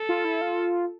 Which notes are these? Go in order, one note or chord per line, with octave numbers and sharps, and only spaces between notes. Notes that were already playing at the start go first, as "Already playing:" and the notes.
Already playing: A4
F4
E4
F4